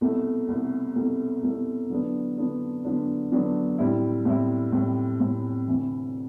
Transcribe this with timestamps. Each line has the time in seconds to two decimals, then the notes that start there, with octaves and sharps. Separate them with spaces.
0.01 C2 B2 A3
0.48 C2 B2 A3
0.96 C2 B2 A3
1.43 C2 B2 A3
1.90 D3 F#3 B3 D4
2.38 D3 F#3 B3 D4
2.84 D3 F#3 B3 D4
3.32 D3 F#3 B3 D4
3.78 A2 G3 C4 E4
4.25 A2 G3 C4 E4
4.72 A2 G3 C4 E4
5.20 A2 G3 C4 E4
5.68 D2 C3 E3